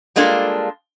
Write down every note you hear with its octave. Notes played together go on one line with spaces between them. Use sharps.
G3 G#3 A#3 D4 F4 A4